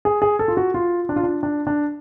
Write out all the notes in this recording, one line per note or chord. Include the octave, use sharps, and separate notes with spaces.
G#4
G#4
A4
F4
F#4
F4
D4
F4
D4
D4
D4